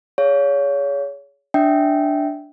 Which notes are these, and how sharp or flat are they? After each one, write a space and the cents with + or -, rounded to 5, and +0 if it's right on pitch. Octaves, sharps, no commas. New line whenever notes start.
G#4 +0 C#5 +25 F5 +0
D4 +0 E5 -10 G5 -20